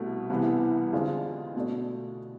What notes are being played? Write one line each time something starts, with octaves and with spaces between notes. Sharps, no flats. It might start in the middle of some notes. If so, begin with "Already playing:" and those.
Already playing: C2 B2 A3
C2 C3 E3 B3
F2 D3 G#3 D4 F4
B2 A3 D4